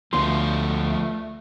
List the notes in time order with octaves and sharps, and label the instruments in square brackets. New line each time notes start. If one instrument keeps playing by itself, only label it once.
[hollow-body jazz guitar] D2 C6 [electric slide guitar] F3 B3 F4 [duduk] A3